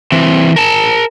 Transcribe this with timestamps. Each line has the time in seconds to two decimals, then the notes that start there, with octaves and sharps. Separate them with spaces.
0.12 E3 C4
0.56 A#4 A5